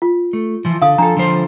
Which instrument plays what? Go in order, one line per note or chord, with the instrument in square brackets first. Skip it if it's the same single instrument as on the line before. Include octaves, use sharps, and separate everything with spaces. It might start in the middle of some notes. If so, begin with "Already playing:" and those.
[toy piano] F4
[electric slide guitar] A3
E3 F3
[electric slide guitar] D3 [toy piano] F5 D#6
[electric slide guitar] F3 A4 [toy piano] D4 A#5
[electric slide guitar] D3 F3 C5